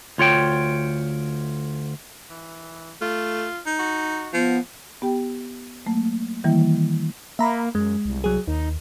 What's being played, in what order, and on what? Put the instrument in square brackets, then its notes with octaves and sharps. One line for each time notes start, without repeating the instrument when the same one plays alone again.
[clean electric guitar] D2 F4 C#5 G5
[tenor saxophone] E3
[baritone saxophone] A3 [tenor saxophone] F4
[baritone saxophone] D#4
[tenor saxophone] F#4
[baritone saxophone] F3 [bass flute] B3
[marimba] B3 G4 G5
F#3 A3 A#3
D#3 E3 G3 A#3 E4
D#3
[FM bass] A#3 [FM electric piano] E5 A#5 B5
[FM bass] F#2 [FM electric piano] G#3
[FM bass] C2
[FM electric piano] F#3 G#4
[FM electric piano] D#2 [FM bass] D#4